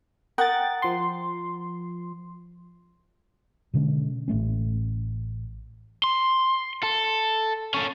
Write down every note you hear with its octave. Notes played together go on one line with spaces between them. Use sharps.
A#4 F#5 G5 D#6 A6
F3 C6
B2 D3 G#3 C#4
A1 E3 A3 C#4
C6
A4
C#4 A4